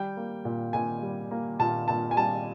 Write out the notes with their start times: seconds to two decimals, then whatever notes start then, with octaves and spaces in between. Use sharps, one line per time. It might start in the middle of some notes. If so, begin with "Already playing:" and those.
Already playing: G3 G5
0.17 A#3
0.45 A#2
0.73 A#2 G#5
1.02 G3
1.31 A#3
1.59 A#2 A5
1.88 A#2 A5
2.11 G#5
2.17 G3 A5